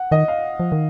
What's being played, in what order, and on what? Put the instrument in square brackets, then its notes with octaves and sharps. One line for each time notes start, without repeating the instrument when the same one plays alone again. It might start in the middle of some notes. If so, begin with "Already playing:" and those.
Already playing: [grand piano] F#5
[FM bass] D#3 [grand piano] D#5
[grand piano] F5
[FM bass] F3
D#3